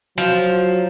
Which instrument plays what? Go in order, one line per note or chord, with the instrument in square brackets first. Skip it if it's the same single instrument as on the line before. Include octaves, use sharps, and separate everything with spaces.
[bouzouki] F3 [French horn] F#3